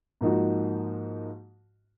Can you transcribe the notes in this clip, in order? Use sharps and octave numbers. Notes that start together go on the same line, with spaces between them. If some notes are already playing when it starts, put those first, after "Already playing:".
G#2 F3 A#3 D#4 F#4